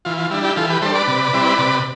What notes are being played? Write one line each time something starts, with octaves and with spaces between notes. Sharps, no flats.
E3 F4
F4
G3 D4 E4
E4 G4
E3 F4 A4
G4 B4
G3 D4 A4 C5
B4 D5
C3
G3 C4 E4
C3